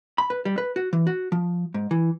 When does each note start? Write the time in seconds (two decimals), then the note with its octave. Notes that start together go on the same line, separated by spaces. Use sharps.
0.18 B5
0.30 B4
0.45 G3
0.58 B4
0.76 F#4
0.93 E3
1.07 F#4
1.32 F3
1.74 G#2
1.91 E3